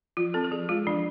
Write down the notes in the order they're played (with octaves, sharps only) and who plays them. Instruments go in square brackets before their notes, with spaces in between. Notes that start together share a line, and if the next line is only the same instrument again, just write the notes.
[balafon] F3 F4
C4 A4
A4
F3 G#4
G#3 F4
F3 D4